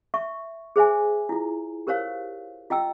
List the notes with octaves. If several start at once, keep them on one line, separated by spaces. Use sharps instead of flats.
E5 C#6
G#4 C5 E5 G#5
E4 F4
G4 A#4 C5 C#5 F5
F4 D#5 G5 E6